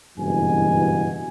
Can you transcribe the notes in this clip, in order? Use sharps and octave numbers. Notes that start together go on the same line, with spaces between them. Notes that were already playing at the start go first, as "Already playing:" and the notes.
F#1 G2 B2 E3 G#5